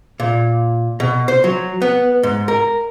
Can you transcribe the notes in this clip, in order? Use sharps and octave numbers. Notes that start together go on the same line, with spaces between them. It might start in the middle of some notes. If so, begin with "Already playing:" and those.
A#2
B2
C5
F#3
B3
G#2
A#4